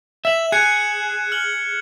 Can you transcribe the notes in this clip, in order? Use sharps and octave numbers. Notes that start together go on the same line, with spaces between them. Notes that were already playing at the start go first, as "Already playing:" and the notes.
E5 E7 F#7
G#4 F#6 G#6 C#7
F6 F#7 G7